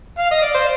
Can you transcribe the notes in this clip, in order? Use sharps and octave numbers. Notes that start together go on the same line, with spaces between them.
F5
D#5
D5
C5